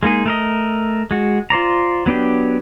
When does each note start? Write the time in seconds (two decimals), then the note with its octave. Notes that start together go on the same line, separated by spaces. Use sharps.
0.03 G#3 A#3 D#4 G#4
0.26 A3 A#4 D#5
1.11 G#3 F#4
1.50 F4 C5 D5 A#5
2.06 F#3 B3 D4 G4